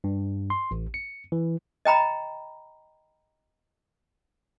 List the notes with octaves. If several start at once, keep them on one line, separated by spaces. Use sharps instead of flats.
G2
C6
A1
C#7
E3
D#5 G5 A#5 B5